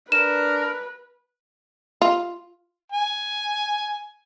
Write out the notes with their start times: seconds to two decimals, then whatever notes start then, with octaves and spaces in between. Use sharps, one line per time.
0.12 D4 A#4 B4 E7
2.02 F4
2.92 G#5